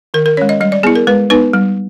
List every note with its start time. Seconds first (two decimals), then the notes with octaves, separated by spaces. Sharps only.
0.14 D#3 A#4
0.26 A#4
0.37 G#3 C#4 C#5
0.49 D#5
0.60 G3 D#5
0.72 D5
0.83 B3 E4 G#4
0.95 A#4
1.07 G#3 B4
1.30 B3 D#4 B4
1.53 G3